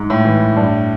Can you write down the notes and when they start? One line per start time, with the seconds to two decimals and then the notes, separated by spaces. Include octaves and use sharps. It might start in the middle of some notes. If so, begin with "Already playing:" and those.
Already playing: G#2
0.10 A2
0.25 E3
0.56 G2